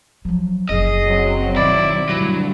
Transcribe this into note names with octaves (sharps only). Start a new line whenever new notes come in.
F3 F#3
F#1 C#3 G#4 D#5
F#3 C4
B2 D#3 E4 D5
D2 G2 F#3 E4